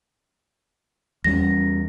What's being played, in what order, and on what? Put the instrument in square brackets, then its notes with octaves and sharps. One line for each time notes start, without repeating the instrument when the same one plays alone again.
[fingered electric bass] E2 G3 C#4 [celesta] A#6